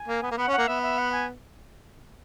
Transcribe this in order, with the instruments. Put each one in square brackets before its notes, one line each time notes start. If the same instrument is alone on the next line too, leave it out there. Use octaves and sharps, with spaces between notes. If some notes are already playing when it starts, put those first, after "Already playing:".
Already playing: [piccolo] G#5
[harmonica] A#3
B3
A#3
[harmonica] B3 [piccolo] F#5
[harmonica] C#4 [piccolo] F#5
[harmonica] A#3
[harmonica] B3 [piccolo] E5
[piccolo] E5
F#5
G#5